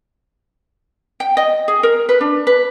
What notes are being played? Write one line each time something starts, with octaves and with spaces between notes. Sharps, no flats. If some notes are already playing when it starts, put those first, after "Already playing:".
G5
D#5
G#4
A#4
B4
D4
B4